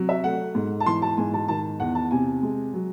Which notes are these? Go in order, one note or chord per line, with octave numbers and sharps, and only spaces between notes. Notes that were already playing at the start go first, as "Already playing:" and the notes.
Already playing: C3 F#3
E5
A3 F#5
G#2
A5
E3 C6
A5
G#2 G#5
A5
D#3 A5
E2 F#5
A5
C3 G#5
G#3
F#3